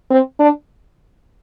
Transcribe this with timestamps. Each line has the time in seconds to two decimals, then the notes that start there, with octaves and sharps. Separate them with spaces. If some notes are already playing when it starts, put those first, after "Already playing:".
0.11 C4
0.40 D4